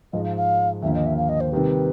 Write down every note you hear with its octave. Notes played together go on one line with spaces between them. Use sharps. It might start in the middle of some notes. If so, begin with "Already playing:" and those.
G#2 F3 G#3 D#5
F5
F5
D#2 D3 F3 A#3 E5
D#5
E5
F5
D#5
C5
C3 D#3 G3 B4